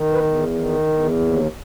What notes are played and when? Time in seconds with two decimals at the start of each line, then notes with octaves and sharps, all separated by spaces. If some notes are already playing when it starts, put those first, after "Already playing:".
Already playing: D#3
0.13 B4
0.23 E2
0.54 D#3
0.87 E2
1.19 D#2